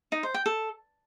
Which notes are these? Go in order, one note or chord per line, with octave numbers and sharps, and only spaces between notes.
D#4
C5
G5
A4